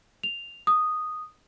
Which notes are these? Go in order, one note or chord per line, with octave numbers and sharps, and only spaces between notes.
F7
D#6